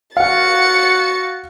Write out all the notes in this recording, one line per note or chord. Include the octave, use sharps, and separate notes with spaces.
F#4 F5 F#5 A6 C#7